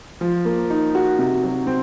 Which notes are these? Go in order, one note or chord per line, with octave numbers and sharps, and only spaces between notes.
F3
A#3
D#4
F#4
C3
F#3
C4